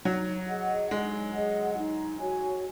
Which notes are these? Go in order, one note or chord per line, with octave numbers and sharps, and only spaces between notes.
F#3 D#4
G#4 D#5 F#5
G#3 D#4
G#4 D#5 F#5
D#4
F#4 C#5 G#5